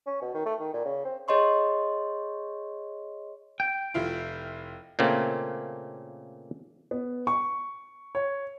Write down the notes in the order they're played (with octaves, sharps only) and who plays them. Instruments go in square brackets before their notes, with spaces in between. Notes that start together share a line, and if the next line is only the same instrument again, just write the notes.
[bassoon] C#4
B2
D#3
A3
D#3
A#2
C#3
C4
[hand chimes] G#4 C#5 D#5 C6 C#6
[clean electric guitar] G5
[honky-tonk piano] F1 E4 F4
[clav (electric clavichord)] A#2 C#3 A3 A#3 C4
[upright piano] B3
C#6
C#5